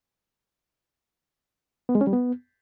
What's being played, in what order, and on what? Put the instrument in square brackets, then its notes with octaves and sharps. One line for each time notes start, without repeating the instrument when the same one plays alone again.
[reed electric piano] B3
G#3
C#4
G3
B3